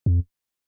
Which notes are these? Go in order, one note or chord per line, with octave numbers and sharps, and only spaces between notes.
F2